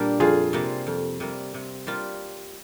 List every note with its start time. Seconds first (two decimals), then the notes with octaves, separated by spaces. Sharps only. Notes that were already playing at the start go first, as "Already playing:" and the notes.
Already playing: A#2 G3 A#3 D4 G4
0.20 F2 F4 G#4
0.53 C3 G3 A#3
0.87 F2
1.20 C3 G3 A#3
1.54 C3
1.87 G3 A#3 F4